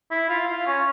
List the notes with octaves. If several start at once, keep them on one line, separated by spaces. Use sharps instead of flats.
E4
F4
F4
C#4